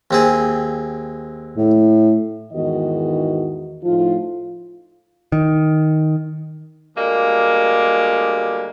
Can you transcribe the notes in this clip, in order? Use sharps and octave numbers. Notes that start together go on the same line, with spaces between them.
D#2 C4 G#4
A2
E2 G#2 D#3 B3 F#4 D#5
A2 F3 D#4 F4
D#3
D2 G3 G#3 A#3